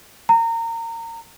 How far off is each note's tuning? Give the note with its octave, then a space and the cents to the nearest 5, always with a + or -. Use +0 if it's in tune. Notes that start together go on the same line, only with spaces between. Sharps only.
A#5 -25